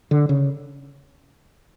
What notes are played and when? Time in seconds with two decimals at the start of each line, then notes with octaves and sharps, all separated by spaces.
0.11 D3
0.29 C#3